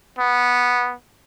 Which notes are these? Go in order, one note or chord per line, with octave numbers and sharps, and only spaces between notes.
B3